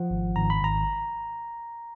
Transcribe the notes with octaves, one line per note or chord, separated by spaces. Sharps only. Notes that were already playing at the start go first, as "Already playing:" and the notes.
Already playing: F3 F#5
G#1
G#1 A#5
B5
G#1 A#5